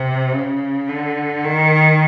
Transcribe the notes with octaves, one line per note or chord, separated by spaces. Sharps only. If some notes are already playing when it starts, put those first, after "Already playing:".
Already playing: C3
C#3
D3
D#3